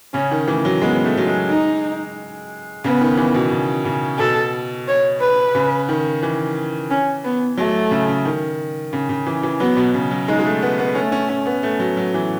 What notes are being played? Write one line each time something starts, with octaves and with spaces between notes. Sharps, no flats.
C#3 C#4
D#3
E3 A3
F#3
G#3 B3
A3
F#3
G#3
D#4
C#3 B3
D#3
E3
B2
C#3
C#3
B2 A4
C#5
B4
C#3
D#3
E3
C#4
B3
F#3 A3
C#3
C#3
D#3
C#3
C#3
E3
E3
F#3 B3
B2
C#3
F#3
G#3 D#4
G#3
A3
B3
B3
A3 C#4
C#4
C#4
B3
A3
F#3
F#3
E3